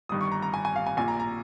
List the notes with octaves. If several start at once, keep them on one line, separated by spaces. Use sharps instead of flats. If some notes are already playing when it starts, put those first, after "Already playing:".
G1 G2 D#3 D#6
C#6
A#5
A#5
G#5
G#5
F5
G#5
A#1 A#2 G#5
A#5
A#5